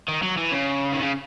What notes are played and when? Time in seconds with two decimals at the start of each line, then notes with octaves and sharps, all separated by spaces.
0.08 D#3
0.23 F#3
0.38 E3
0.52 C#3
0.93 D#3
1.02 C#3